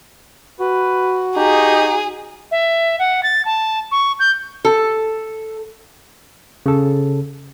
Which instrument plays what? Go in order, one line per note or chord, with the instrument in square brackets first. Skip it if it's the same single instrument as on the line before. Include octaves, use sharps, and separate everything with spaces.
[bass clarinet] F#4 [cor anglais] B4
[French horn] D#4 [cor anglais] G4 [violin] G#4
[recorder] E5
F#5
A6
A5
C#6
G6
[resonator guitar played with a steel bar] A4
[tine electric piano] C#3 A4